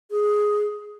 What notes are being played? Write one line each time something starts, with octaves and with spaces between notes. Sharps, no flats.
G#4